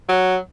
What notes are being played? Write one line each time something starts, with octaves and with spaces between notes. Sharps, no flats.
F#3